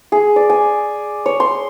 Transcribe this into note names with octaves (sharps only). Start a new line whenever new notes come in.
G#4
D5
G#5
C#5
C6